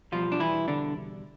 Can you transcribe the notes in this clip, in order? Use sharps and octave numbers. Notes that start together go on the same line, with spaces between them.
E2 B2 F3 G3 F4
D4
E3 E4
D3 D4